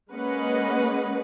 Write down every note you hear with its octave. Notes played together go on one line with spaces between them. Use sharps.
G#3 A#3 C#4 B4 D#5 F#5